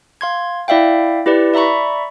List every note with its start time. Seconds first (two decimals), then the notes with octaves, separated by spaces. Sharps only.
0.21 F5 C6 G#6
0.68 E4 D5 E5 F5 G5
1.26 E4 G4 B4 D5
1.54 D5 E5 A#5 B5 C#6